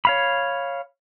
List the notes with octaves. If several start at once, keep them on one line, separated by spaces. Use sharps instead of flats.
C#5 F5 B5